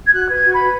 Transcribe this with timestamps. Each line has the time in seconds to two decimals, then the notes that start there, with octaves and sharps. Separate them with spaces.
0.06 G#6
0.13 F#4 F#6
0.28 B4 G#6
0.43 F#4
0.53 B5
0.59 B4